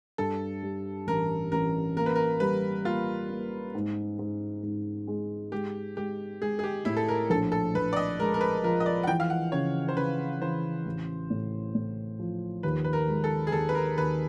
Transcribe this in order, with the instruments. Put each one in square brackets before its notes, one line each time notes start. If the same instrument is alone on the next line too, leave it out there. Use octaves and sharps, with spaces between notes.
[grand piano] G2 [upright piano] A4
[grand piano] G3
[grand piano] A1 [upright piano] A#4
[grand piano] A1 [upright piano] A#4
[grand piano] A#3 [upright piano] A#4
[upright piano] B4
A#4
[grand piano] G3 [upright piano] B4
[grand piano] A#3 [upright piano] F4
[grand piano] A#3
G#2
G#2
G#2
G#3
[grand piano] G#3 [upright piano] G4
[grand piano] G#3 [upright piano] G4
[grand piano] G#3 [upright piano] G#4
[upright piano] G#4
G4
[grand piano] A2 [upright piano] E4
[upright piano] A4
A#4
[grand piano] A#1 [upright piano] A4
[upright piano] A4
[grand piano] A#1 [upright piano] B4
[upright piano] D5
D#5
[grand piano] G#3 [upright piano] A#4
[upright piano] A#4
B4
[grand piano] F3 [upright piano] A#4
[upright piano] D#5
D5
F#5
[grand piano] E3 [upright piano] G5
[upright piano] F5
F#5
[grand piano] C#3 [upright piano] C#5
[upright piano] C5
[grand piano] C#3 [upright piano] B4
[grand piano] E3 [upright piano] C5
[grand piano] A1
A2
A2
F3
[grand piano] D#2 [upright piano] B4
[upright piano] B4
A#4
[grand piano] G#3
[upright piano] A4
G#4
[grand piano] D#2 [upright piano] A4
[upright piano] B4
A#4
[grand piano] D#2 [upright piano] B4